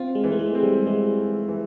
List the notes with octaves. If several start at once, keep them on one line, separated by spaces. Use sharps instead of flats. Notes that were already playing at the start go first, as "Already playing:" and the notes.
Already playing: C4 F4
G#3
E3
A3
G#3
C4
G3
E3 G#3
A3
E3